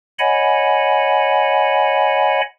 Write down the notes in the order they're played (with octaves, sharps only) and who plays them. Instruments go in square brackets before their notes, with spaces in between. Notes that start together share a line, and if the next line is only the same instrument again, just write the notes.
[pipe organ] C#5 D#5 F#5 G#5 B5